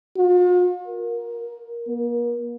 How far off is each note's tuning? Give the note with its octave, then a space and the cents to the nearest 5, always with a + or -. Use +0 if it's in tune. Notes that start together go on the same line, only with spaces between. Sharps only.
F4 +45
A#4 +10
A#3 +40